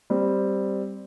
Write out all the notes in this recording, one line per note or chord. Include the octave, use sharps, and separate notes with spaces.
G3 C4